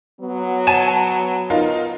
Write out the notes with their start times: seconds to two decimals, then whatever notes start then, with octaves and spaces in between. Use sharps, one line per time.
0.21 F#3 B3
0.67 G#5 A5 E7
1.50 D#4 F4 A#4